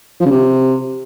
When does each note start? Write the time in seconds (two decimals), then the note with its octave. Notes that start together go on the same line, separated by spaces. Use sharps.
0.21 F3
0.26 C#3
0.31 C3